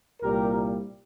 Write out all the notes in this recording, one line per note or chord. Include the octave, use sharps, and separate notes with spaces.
C2 A#2 G3 G4 A#4